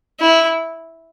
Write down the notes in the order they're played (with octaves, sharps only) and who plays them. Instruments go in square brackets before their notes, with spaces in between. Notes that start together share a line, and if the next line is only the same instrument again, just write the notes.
[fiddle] E4